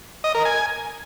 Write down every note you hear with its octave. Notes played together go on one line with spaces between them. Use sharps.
D#5
A#4
G#5